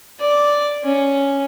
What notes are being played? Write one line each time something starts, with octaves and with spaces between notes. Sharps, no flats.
D5
C#4